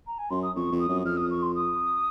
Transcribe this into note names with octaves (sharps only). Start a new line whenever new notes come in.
A#5
G#5
F#2 C6
D#6
F2 C#6
F2
D#6
F#2
F2 F6
D#6
C#6
C6
D#6